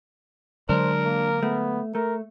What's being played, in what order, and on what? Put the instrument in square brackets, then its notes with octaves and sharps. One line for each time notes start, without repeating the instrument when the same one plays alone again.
[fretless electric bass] D3 F#3 G#3 [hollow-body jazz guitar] D4 [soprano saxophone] A#4 [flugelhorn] C5
[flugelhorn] A#3
[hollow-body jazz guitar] A3 [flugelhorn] B3
[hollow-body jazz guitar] A3 [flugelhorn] A#4